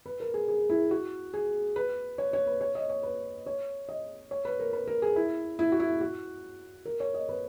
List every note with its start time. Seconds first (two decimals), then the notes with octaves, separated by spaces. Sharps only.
0.06 B4
0.20 A#4
0.34 G#4
0.48 G#4
0.70 E4
0.91 F#4
1.34 G#4
1.76 B4
2.18 C#5
2.33 C#5
2.47 B4
2.61 C#5
2.75 D#5
2.89 C#5
3.03 B4
3.46 C#5
3.89 D#5
4.31 C#5
4.45 B4
4.60 A#4
4.73 B4
4.87 A#4
5.02 G#4
5.16 E4
5.59 E4
5.72 F#4
5.80 E4
6.01 F#4
6.85 A#4
7.00 C#5
7.14 D#5
7.29 B4